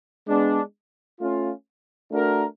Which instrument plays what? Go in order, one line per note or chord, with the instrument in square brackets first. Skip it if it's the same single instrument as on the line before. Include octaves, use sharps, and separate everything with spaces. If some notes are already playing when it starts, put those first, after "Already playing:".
[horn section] G#3 B3 D4
A3 C#4 F4
A3 D4 F#4 A#4